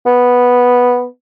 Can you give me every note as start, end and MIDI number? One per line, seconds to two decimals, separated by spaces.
0.06 1.06 59